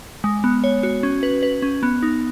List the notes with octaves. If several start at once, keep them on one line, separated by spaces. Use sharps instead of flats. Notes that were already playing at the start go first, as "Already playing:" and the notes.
G#3
B3
C#5
F#4
C#4
B4
B4
C#4
B3
D#4